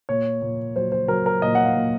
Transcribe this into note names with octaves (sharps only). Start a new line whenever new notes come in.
A#2 C#5
A#2
F#3 C5
C5
F#3 A#4
A#4
A#2 D#5
F#5
F5
A#2